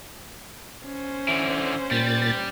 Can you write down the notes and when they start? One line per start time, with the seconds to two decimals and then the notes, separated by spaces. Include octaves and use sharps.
0.85 C#4 C5
1.28 D3 E3
1.91 A#2 G3 A6